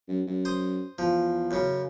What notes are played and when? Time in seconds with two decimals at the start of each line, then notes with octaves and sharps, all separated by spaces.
0.08 F#2
0.27 F#2
0.45 C5 D#6
0.98 E2 F3
1.51 F#2 C#3